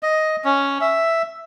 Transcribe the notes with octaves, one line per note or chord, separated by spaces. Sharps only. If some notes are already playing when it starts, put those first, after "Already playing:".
D#5
C#4
E5